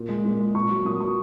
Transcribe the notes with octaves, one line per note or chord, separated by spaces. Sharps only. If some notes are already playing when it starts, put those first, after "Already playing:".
Already playing: A#2
G#3
A#2
G#3
A#2 C#6
F#3
A#2 D#6
F#3 C#6